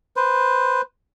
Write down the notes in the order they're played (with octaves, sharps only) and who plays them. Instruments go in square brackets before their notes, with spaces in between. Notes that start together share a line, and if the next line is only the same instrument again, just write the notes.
[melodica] B4 C5